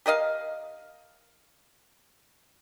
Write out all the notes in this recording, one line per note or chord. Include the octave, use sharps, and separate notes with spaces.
G4 A#4 D#5 F5